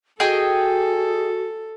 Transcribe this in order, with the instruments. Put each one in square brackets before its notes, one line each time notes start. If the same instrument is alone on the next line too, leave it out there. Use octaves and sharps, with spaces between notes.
[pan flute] F#4 [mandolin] G#4 D#5 G5 [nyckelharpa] A4